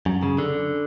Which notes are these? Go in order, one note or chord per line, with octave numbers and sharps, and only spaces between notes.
F#2
C#3
D3